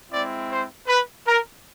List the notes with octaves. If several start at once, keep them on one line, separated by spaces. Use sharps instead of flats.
G#3 C4 E4 D5
C5
B4
A#4